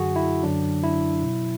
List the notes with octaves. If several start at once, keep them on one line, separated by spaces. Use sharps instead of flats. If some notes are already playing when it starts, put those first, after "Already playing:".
Already playing: F#2 D3 F#3 F#4 G#4
E4
F#2 D3 F#3 D4
E4
B2 F#3